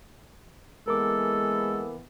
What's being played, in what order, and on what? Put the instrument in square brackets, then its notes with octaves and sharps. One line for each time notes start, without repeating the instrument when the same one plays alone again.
[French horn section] E3 A#3 B3 [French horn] G#3 [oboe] A4 [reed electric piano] A#4 D6